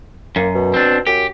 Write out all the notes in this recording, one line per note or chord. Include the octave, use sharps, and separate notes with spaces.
F#2 A#3
B2
C4 D4
F#2 G4